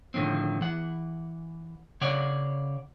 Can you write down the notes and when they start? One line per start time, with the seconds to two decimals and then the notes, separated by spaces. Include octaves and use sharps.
0.14 A2 D3 D#3 F3 C4
0.61 E3 F#5
2.01 C#3 C#5 D5 F#5